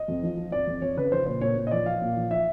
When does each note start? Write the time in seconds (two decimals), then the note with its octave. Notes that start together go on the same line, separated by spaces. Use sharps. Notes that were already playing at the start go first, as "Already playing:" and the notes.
Already playing: D#5
0.08 F2
0.23 F3
0.37 F3
0.52 F2 D5
0.67 F2
0.82 F2 C#5
0.97 C#3 B4
1.12 F3 C5
1.26 A#2 C5
1.41 A#2 C#5
1.56 A#2
1.67 D#5
1.71 F3 D5
1.86 F3 F5
2.02 A#2
2.16 F3
2.31 F3 E5